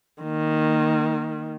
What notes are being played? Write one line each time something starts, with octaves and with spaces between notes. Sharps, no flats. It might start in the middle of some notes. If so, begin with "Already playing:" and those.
D#3 A#3